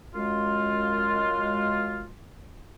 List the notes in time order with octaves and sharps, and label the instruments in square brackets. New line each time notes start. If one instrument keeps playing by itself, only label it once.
[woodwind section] F#2 G#3 F4